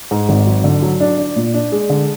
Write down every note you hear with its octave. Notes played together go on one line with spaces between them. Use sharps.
G#2
G#1
F#3
D3
F#3
D4
D4
A#2
D4
G#3
D3